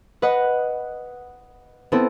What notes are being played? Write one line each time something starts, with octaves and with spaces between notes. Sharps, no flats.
B4 D#5 F#5
B3 C4 E4 A4